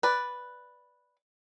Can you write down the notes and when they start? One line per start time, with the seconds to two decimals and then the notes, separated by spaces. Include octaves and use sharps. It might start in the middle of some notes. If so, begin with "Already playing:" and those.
0.03 B4 D5